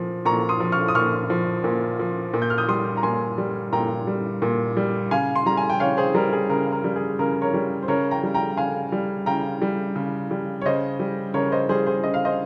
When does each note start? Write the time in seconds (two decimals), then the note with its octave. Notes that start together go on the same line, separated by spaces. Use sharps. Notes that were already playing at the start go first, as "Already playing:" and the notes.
Already playing: A#2 F3
0.25 A#2 A#5 C#6
0.49 C6 D#6
0.60 F3
0.72 C#6 F6
0.88 D#6
0.95 A#2 C#6 F6
1.30 F3
1.64 A#2
1.99 F3
2.34 A#2
2.42 G6
2.50 F6
2.58 D#6 G6
2.68 G3 C6 D#6
2.97 A#5
3.03 A#2 G#5 C6
3.38 G3
3.73 A#2 G5 A#5
4.07 G3
4.42 A#2
4.77 G3
5.11 C#3 F5 G#5
5.35 C6
5.46 G3 A#5
5.57 G#5
5.70 G5
5.80 C#3 C#5 F5
5.97 G#4 C5
6.15 G3 A#4
6.33 G#4
6.49 C#3 A#4
6.72 A#4
6.84 G3
6.96 G#4
7.19 C#3 A#4
7.42 A#4 C#5
7.54 G3
7.83 C5
7.88 C#3 A#4 C#5
8.11 G5 A#5
8.23 G3
8.34 G5 A#5
8.57 C#3 F5 G#5
8.92 G3
9.26 C#3 G5 A#5
9.62 G3
9.96 C#3
10.31 G3
10.61 C#5
10.65 C#3 C5 D#5
10.99 G3
11.34 C#3 A#4 C#5
11.52 C5 D#5
11.69 G3 G#4 C5
11.86 G#4 C5
12.04 C#3 D#5
12.14 F5
12.25 C5 D#5